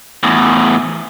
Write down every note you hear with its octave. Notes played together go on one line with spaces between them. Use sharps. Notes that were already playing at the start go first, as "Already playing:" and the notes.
E2 A2